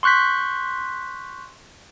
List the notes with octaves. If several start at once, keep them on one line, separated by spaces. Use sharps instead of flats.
C6 C#6 F#6 G6 B6